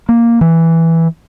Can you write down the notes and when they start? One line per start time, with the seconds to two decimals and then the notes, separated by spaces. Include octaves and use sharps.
0.09 A#3
0.41 E3